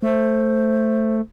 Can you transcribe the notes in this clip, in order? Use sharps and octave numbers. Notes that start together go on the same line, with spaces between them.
A3 C5